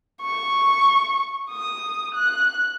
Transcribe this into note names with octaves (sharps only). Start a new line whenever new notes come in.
C#6
D#6
F#6